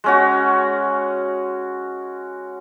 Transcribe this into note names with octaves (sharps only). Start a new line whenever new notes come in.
G#3 C#4 F#4